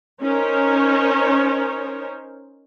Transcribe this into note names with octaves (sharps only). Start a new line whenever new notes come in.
C#4 D#4 A#4 C5 C#5